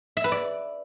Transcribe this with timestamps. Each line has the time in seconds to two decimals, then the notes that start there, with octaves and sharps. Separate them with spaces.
0.17 E5
0.24 B4
0.32 D5